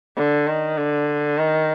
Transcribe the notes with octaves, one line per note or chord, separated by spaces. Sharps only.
D3
D#3
D3
D#3